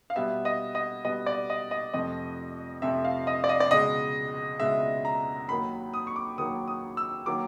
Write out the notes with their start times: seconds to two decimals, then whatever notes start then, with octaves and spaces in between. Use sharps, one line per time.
0.10 F5
0.16 B2 G3 B3 E5
0.45 D#5
0.75 D#5
1.05 B2 G3 B3 D#5
1.26 D5
1.50 D#5
1.71 D#5
1.94 F2 C3 F3 A3 D#5
2.82 F2 C3 F3 A3 E5
3.05 F5
3.27 D#5
3.44 D5
3.49 D#5
3.60 D5
3.71 C#2 B2 G#3 D#5
4.60 C#2 B2 G#3 E5
5.05 A#5
5.49 D#2 D#3 F#3 A#3 B5
5.94 D#6
6.07 C#6
6.16 D6
6.38 D#2 D#3 F#3 A#3 D#6
6.68 D#6
6.97 E6
7.26 D#3 F#3 A#3 D6